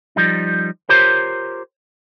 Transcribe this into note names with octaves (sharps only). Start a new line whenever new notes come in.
F3 G3 D#4
F4 G4 A#4 C5 C#5